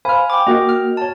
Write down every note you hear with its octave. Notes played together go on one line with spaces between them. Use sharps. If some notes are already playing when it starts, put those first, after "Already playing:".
C5 F5 G#5 B5 F6
G5 D6
A#3 F#4 D#5 G5
F6
C#5 A5